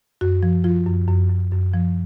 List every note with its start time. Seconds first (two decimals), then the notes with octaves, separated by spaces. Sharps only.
0.21 F#2 F#4
0.43 F3
0.64 F3 F4
0.86 F#2
1.08 F#2
1.29 F#2
1.52 F#2
1.74 F3